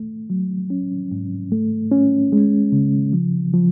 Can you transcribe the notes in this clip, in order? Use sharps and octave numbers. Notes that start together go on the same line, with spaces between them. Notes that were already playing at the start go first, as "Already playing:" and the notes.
Already playing: A3
F#3
C#4
G#2
A3
C#4
G#3
C#3
F3
F3